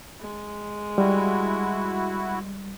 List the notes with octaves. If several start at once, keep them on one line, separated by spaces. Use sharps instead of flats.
G#3
G3 E4 F#4